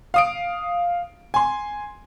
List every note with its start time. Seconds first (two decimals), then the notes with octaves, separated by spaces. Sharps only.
0.14 F5 D#6 D7
1.34 G#5 C6